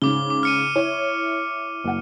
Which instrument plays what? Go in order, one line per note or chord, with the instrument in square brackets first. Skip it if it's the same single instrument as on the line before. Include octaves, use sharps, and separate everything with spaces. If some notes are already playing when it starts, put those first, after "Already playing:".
[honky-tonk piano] G#2 C#3 [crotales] D6 G7
[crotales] D6
F6 C#7 D#7
[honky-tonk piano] E4 C#5 E5
F#1 F#5